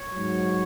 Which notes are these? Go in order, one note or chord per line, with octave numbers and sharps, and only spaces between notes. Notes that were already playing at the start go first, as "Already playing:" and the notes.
Already playing: C#5
G#2 F#3